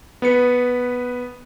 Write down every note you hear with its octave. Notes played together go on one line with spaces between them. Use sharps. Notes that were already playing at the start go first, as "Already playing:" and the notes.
B3 B4 C#7